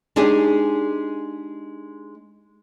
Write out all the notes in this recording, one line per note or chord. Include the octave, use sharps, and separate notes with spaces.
G#3 D4 D#4 G4 G#4